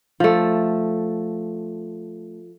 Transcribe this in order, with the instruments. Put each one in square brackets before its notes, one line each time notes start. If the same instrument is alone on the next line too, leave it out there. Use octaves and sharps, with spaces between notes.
[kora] F3 A3